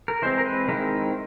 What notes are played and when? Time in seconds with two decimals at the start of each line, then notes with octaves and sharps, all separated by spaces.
0.08 A#4
0.22 E3 G#3 C4 C5
0.38 A#4
0.45 B4
0.68 D#3 G#3 C4 E4 A#4